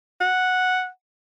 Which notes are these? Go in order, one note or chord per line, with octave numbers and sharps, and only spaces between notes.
F#5